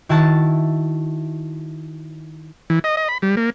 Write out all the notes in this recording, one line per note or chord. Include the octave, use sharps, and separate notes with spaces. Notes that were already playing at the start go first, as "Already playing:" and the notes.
D#3 E4 F#4 A5 A6
E3
D#5
D#5
B5
G3
A#3